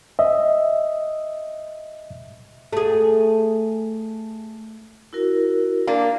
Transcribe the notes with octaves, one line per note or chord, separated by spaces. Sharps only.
D#5 E5
A3 G#4
E4 F#4 A#4
A#3 D4